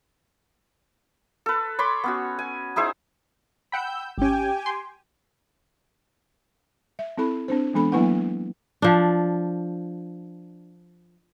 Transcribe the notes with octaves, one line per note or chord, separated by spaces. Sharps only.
A4 B4
C#5 B5 C6 D6
B3 C#4 F#4
G#5
D#4 E4 G#4 C5
F#5 G5 B5 E6 G6
G#1 C#4 G4 G5 G#5
C6
E5
C4 E4 A4 B5
C4 D4 C5
E3 G#3 B3 D4 A4 B5
F#3 A#3 B3 E4 B4 F#5
F3 D4